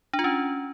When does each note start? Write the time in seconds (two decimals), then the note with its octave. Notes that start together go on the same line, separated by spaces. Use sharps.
0.13 D4
0.19 F4
0.24 C#4